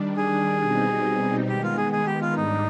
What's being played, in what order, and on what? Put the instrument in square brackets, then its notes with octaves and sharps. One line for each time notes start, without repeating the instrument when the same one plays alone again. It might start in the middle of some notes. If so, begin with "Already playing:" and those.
Already playing: [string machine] D#3 G3 D4
[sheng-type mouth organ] G#4
[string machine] B2 G3 C4 D#4
[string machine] D#3 G#3 B3 [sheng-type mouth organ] G4
[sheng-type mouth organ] F4
G#4
G#4
G4
F4
[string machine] G#2 G3 D4 [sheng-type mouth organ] D#4